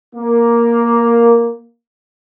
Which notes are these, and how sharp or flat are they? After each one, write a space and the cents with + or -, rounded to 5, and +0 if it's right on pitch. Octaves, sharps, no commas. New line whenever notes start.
A#3 +5